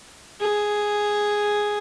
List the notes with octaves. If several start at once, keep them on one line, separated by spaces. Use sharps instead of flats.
G#4